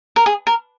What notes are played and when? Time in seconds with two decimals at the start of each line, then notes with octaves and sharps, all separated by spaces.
0.16 A#4
0.26 G#4
0.47 A#4